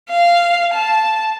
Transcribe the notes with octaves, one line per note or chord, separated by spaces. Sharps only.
F5
A5